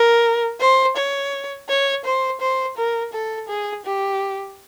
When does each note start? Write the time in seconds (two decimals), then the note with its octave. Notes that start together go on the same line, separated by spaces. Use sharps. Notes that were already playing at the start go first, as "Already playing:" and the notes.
Already playing: A#4
0.60 C5
0.96 C#5
1.68 C#5
2.04 C5
2.40 C5
2.77 A#4
3.13 A4
3.48 G#4
3.85 G4